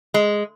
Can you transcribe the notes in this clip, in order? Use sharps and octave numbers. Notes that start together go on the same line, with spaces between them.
G#3